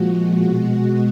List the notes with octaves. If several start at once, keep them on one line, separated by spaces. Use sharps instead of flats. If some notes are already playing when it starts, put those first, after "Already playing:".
Already playing: A#2 F3 G#3 F#4
B2 G#3 F#4